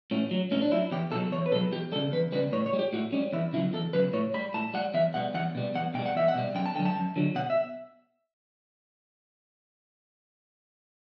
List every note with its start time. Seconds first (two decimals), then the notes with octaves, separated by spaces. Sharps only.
0.11 A2 C#4
0.31 F#3
0.51 A2 C#4
0.62 D4
0.71 F#3 E4
0.91 E2 G4
1.12 B2 F#3 A4
1.32 E2 C#5
1.46 B4
1.52 B2 A4
1.55 F#3
1.72 E2 G4
1.92 G3 A4
1.96 C#3
2.12 E2 B4
2.32 C#3 G3 B4
2.52 A2 C#5
2.66 C#5
2.73 G3
2.79 G4
2.93 A2 F#4
3.12 G3 C#4
3.33 E2 E4
3.53 C#3 E4
3.56 F#3
3.74 E2 A4
3.93 C#3 F#3 B4
4.13 A2 C#5
4.34 G3 B5
4.54 A2 A5
4.74 G3 F#5
4.94 E2 E5
5.14 B2 G3 F#5
5.34 E2 F#5
5.55 B2 G3
5.75 E2 F#5
5.94 B2 G3 G5
6.06 F#5
6.15 E2 E5
6.28 F#5
6.35 B2 G3
6.55 F#2 G5
6.66 A5
6.75 D3 G5
6.79 F#3
6.85 A5
6.96 F#2
7.16 D3 F#3
7.35 B2 F#5
7.50 E5